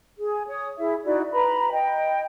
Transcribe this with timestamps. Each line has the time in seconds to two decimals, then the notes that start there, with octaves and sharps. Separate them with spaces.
0.18 G#4
0.48 C#5 D#6
0.78 E4 G#4 E5
1.04 D#4 E4 F#4 D5
1.31 B4 A#5 B5
1.71 D#5 G5